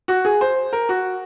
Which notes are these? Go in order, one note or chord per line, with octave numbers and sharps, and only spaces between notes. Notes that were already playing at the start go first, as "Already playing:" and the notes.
F#4
G#4
C5
A#4
F#4